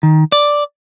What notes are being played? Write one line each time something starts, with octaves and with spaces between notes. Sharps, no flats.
D#3
D5